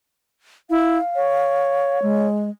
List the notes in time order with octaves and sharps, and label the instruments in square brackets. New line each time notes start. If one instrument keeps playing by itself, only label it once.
[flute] E4 [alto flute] F5
[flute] C#5
[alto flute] G#3